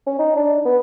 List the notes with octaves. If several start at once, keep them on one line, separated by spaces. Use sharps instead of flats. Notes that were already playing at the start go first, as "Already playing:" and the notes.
C#4
D#4
D4
B3